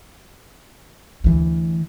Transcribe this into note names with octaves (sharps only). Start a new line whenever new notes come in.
D2 E3